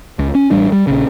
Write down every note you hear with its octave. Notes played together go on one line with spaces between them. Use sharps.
C#2
C#4
A1 G3 D4
G3
A#1 C#3